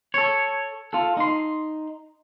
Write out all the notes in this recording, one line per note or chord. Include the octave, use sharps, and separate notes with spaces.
A4 C#5
F4 A4
D#4 C6